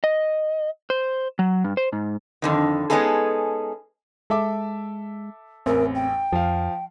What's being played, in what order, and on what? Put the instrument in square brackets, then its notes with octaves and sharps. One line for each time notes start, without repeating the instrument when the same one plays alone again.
[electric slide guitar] D#5
C5
F#3
G2
C5
G#2
[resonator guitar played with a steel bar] F2 D3 D#3
G#3 B3 C#4 D#4 G#4 A4
[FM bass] G#3 [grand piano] A4 E5 D6
[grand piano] A1 E2 [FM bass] C4 [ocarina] A#4
[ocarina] G5
[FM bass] F2 [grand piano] F3 F5